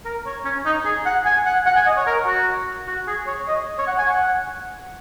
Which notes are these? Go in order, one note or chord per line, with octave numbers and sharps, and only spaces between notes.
A#4
C#5
C#4
D#4
G#4
F#5
G#5
F#5
F#5
G#5
D#5
C#5
A#4
F#4
F#4
G#4
C#5
D#5
C#5
F#5
G#5
F#5